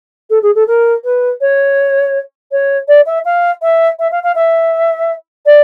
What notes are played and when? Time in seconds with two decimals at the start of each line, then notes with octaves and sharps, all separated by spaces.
0.30 A4
0.43 G#4
0.55 A4
0.67 A#4
1.04 B4
1.41 C#5
2.52 C#5
2.88 D5
3.06 E5
3.25 F5
3.62 E5
3.99 E5
4.12 F5
4.24 F5
4.35 E5
5.46 D5